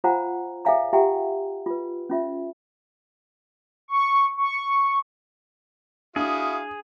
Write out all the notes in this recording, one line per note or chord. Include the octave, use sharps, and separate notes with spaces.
F4 C5 F5 F#5 G#5 A#5
G#4 C#5 E5 F5 G#5 A#5
F4 G4 E5 F#5 G5 A#5
F4 B4
C#4 F4 E5
C#6
C#6
D4 E4 F#4 G#4 F5 D#6